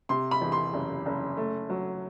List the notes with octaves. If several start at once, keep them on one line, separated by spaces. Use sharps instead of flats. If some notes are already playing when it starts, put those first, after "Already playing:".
C3 C6
B5
E2
C6
F#1
F#1
A3
F#3